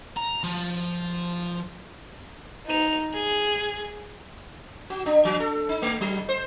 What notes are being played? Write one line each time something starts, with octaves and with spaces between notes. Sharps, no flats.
A#5
F3
D#4 F7
G#4
F#4
D4
F3
A4
D#4
A3
F#3
C5